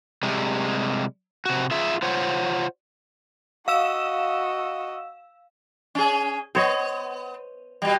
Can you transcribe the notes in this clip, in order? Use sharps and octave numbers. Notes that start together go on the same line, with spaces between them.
C3 G3 G#3
C3 F#4
F4 G#4 E5
F4 C5 C#5 F#5
F#4 D#5 F5 E6 E7
C#4 G#4
B3 C5 C#5 D#5
B2 G3